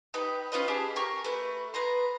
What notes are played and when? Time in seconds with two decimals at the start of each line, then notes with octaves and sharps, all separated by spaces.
0.14 D#4 G4 B4 G5
0.52 C#4 F4 B4 D#5
0.68 G4 G#4 A5
0.96 G4 A#4 C#6
1.24 A3 B4
1.74 B3 B4 A#5 C6